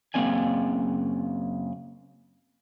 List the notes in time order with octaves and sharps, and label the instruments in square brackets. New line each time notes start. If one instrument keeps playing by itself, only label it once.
[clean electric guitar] F#2 C#3 A#3 C4 D5 G#5